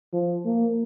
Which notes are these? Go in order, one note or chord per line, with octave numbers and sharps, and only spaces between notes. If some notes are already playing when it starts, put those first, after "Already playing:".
F3
A#3